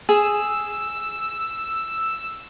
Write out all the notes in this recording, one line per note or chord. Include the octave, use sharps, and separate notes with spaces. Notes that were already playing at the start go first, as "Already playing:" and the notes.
G#4 E6